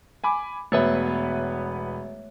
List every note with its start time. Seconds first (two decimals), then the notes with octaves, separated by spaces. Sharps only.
0.24 G#5 B5 D6
0.72 E1 A3 B3 B4 C#5 E5